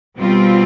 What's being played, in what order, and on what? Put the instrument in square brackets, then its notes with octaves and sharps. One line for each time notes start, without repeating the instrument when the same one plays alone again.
[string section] B2 G3 C4 F4